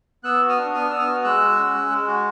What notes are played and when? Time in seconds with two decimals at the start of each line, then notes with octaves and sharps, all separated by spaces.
0.24 B3 E6 F#6
0.41 F#4
0.49 D#6 F6
0.58 D4
0.74 B3 D#6 F6
0.90 B3 E6
0.99 D#6 F6
1.07 F#4
1.24 G#3 E6 F#6
1.40 F#4
1.57 C#4
1.74 G#3
1.90 G#3
2.08 F#4